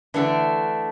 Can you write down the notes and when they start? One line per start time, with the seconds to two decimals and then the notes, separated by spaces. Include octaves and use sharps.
0.14 D3 E3 A3 D4